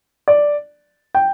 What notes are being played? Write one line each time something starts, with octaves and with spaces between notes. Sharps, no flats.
D5
G5